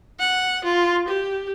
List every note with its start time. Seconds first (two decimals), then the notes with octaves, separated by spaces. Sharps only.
0.20 F#5
0.64 F4
1.08 G4